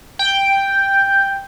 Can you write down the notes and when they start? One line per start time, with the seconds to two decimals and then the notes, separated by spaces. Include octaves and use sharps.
0.19 G5